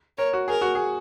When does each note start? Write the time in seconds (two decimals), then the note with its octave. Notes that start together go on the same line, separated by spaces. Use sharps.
0.18 A#4 C#5
0.33 F#4
0.48 G#4 A#4
0.61 F#4
0.75 G#4